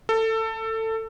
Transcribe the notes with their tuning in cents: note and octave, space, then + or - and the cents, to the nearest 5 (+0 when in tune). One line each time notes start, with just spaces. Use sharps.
A4 +20